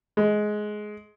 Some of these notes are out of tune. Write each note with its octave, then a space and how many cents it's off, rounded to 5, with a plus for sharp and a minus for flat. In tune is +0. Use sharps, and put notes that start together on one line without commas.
G#3 +15